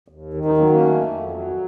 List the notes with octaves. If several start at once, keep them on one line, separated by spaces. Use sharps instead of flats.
D#2
D#3
C4 D#4
F#3 A#3 C#4
A#3 C#4
A3
F2
F#3